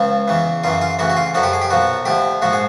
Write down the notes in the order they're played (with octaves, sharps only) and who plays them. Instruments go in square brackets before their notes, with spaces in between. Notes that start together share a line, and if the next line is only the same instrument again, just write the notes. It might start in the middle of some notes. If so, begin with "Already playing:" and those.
Already playing: [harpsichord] C#2 C#3 F3
E2 C#3 E3
F#2 C#3 E3 F4
F4
D2 C#3 E3 F#4
F#4
F4
F#2 D3 F3 F#4
G4
G#4
G4
B1 A#2 F3 F#4
D2 D3 F3 G4
A#1 G#2 F3 F#4
G#4